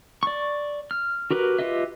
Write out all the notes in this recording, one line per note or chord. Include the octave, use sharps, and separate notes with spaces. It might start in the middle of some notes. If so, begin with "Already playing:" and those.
D5 C#6
F6
F#4 G4 A#4 B4
F4 G4 B4 D#5 E5